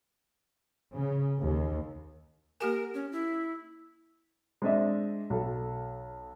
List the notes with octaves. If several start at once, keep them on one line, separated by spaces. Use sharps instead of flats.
C#3
D#2
A#3 G4 A#4 G#5
C#4
E4
G#3 C4 D4 D#5 E5
B1 A4